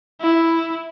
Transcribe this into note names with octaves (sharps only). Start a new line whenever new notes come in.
E4